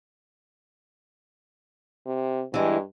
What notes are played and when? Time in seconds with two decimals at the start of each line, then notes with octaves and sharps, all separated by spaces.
2.07 C3
2.54 G2 E3 G#3